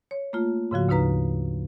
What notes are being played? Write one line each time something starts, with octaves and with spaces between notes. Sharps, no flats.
C#5
A3 A#3 F4
G#2 C#3 F3 F#4
D2 C#3 D#4 B4 A#5